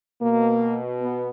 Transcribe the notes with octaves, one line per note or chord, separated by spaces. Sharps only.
B2 A#3
B3